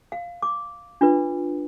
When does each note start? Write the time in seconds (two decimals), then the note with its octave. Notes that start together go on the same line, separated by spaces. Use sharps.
0.12 F5
0.42 D6
1.01 D4 F4 B4